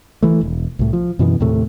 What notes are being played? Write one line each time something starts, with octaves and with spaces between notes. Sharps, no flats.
E3 A3
E1
C2 A2
F3
F#2 B2 E3 B3
D#2 A2 C3 A3